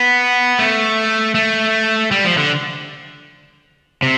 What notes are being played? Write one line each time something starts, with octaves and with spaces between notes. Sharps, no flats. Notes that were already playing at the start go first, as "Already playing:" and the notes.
Already playing: B3
A3
A3
G3
F3
D3
C3